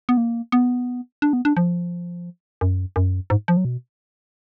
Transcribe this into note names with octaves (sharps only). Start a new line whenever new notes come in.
B3
A#3
B3
D4
B3
D4
F3
F#2
F#2
G#2
F3
F#3
B2